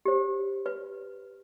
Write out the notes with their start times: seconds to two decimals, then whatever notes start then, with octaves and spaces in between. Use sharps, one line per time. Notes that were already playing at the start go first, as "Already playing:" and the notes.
0.05 G4 C5
0.66 B4